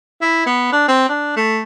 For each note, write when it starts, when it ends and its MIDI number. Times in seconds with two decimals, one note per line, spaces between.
0.22 0.42 64
0.46 0.69 59
0.72 0.87 62
0.88 1.09 60
1.09 1.33 62
1.36 1.62 57